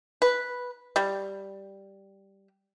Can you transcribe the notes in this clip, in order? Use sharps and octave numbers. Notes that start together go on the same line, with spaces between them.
B4
G3